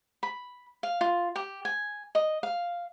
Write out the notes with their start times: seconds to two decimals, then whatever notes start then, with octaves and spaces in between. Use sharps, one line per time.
0.23 B5
0.83 F5
1.01 F4
1.36 G4
1.65 G#5
2.15 D#5
2.43 F5